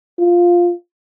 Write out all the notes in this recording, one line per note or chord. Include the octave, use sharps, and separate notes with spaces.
F4